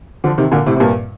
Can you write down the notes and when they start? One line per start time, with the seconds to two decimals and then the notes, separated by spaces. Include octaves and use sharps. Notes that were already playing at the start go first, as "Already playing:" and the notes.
0.24 D3 F3
0.38 C3 D#3
0.52 A#2 D3
0.66 A2 C3
0.76 C3
0.80 G2 A#2